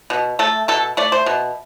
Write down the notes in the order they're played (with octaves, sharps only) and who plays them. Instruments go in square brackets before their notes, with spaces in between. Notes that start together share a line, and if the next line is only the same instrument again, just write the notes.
[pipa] B2
A3 A4
B2 A4
A3 D5
C5
B2